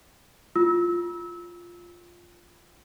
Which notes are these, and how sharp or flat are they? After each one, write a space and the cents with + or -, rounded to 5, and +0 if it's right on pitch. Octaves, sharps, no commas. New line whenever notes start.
F4 +0 E6 -25